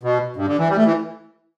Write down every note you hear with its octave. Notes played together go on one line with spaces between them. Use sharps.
B2
G2
D3
E3
G3
A3
E3